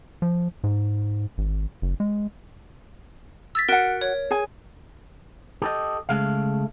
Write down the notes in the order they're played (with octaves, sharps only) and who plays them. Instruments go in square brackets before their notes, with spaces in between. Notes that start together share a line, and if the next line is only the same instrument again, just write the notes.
[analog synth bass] F3
G#2
G#1
F#1
G#3
[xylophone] E6 A6 B6
[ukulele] F#4 F#5 [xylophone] A#4 D7
[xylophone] C#5
[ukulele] G#4 G#5
[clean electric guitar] G4 A4 D#5
C#3 G#3 A3 F5